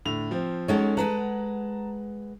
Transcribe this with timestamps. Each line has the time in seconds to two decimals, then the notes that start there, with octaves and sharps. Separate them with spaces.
0.05 A2 D3 F7
0.31 F3 C4
0.68 F#3 G#3 C#4 D#4 A4 C#5
0.97 G#3 B4 F#5 A5 A#5